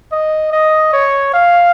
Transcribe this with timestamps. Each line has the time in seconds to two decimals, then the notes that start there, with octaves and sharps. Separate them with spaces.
0.12 D#5
0.52 D#5
0.93 C#5
1.34 F5